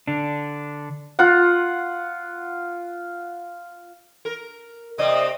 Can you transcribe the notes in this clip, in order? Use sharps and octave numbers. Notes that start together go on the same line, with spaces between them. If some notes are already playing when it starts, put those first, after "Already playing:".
D3 D4
F4 F#5
A#4
C3 C4 D5 D#5